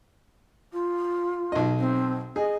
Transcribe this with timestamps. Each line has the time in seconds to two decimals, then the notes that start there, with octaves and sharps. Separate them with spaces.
0.72 F4
1.52 B1 D#5
1.78 C4
2.36 G#4 D#5